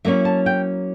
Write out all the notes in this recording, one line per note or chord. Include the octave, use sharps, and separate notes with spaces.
F#3 A#3 C#4 E4 E5
A5
G5